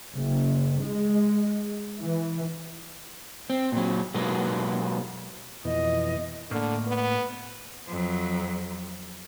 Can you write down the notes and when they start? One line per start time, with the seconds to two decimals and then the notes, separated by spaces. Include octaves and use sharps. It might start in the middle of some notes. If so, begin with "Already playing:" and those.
0.16 F#1
0.82 G#3
2.00 E3
3.50 C4
3.72 A#2 F#3
4.14 B2 F#3 G#3 A#3 B3
5.65 F2 B2 E3 D#5
6.51 A2 D3 A#3
6.88 B3
7.89 F2 F#3